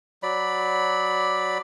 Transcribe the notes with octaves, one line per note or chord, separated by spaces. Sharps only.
F#3 D5 B5